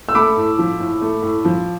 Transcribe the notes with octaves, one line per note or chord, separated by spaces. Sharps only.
E6
A3 B5 D6
A2
F3
A2
A3
A2
F3